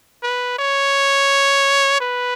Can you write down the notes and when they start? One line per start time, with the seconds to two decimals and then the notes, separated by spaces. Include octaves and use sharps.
0.23 B4
0.58 C#5
2.00 B4